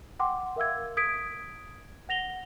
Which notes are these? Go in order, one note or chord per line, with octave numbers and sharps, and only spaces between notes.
F#5 G5 C6 D6
A#4 E5 F5 E6 G#6
D#6 G#6 B6 D7
F#5 A#6 F7 G7